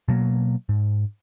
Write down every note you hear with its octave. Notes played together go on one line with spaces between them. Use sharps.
B2 F#3 A#3
G#2